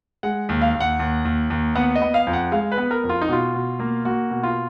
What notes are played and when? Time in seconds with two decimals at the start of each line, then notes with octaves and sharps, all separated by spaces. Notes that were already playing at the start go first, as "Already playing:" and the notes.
0.23 G#3 F#5
0.49 D#2
0.62 F5
0.74 D#2
0.80 F#5
1.00 D#2
1.25 D#2
1.50 D#2
1.75 B3 F#5
1.95 D#5
2.02 B3
2.14 F5
2.27 F2
2.33 F#5
2.52 G#3 F5
2.72 B4
2.78 B3
2.91 A#4
3.04 F2
3.09 F4
3.21 D#4
3.29 B2 F4
3.54 B2
3.80 A#3
4.05 A#3 F#4
4.31 B2
4.43 F4